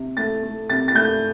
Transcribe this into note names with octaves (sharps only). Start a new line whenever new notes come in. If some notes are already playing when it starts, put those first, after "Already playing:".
Already playing: C3
A3 A6
A3
C3 A6
A6
A3 G6